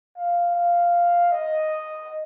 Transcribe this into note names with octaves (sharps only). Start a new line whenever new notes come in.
F5
F5
D#5